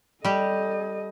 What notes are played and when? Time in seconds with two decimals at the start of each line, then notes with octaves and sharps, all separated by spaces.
0.25 G3 G4 A4 D#5